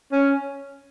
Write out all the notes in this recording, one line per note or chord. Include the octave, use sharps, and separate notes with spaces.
C#4